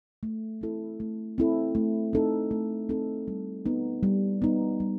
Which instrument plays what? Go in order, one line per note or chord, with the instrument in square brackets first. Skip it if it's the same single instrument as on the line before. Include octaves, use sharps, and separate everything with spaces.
[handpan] A3
C4 E4 A4
A3
C4 E4 A4
A3
C4 D#4 A4
A3
C4 D#4 A4
G3
B3 D#4
G3
B3 D#4
G3